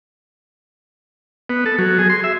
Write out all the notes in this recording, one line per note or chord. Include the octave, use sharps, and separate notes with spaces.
B3
A4
F#3
G#4
C6
E5